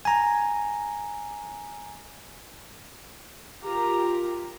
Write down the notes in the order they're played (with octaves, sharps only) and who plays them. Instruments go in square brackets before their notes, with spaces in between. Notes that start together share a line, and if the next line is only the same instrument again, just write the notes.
[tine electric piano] G#5 A#5
[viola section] F4 G4 A#4 A#5